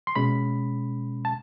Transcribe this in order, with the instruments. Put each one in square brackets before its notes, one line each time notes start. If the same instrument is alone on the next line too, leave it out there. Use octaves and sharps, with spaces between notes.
[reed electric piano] C6
B2 G#3 C#4 B5
A5